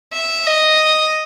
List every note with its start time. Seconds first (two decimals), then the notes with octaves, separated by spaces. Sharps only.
0.13 E5
0.47 D#5